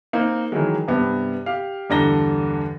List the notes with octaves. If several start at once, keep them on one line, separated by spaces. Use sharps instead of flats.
A#3 C4 D#4
D#3 E3 F#3 G#3
G2 C3 B3
G4 F5
E2 G2 D3 A#5 A#6 G7